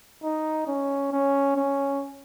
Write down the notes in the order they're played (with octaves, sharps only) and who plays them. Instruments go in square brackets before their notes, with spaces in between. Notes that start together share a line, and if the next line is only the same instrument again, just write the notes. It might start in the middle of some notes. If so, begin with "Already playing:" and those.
[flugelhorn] D#4
C#4
C#4
C#4